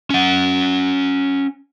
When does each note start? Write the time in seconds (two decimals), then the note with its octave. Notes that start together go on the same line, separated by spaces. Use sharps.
0.10 C#4 F#5